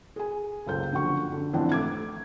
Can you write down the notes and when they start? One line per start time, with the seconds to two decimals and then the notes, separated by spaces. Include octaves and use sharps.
0.16 G#4 G#5
0.66 F#1 C#2 A4 C5 G6
0.92 F#1 D3 F3 F#4 F#5 C#6
1.32 D3
1.54 G#1 F2 E3 D4 C5 F#5
1.72 A3 D6 G#6